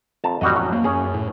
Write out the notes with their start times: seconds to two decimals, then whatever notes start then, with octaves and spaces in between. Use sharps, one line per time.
0.24 F2 A5 A#5
0.41 A1 F2 G3 F#4 D#5
0.56 F#3 C#4
0.73 A#3
0.84 F#2 C#4 G#4
1.14 A2